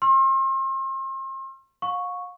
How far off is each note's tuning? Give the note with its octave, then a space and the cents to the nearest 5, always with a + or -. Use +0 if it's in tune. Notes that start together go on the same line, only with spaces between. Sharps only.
C6 +40 E6 +40
F5 +40 C#6 +0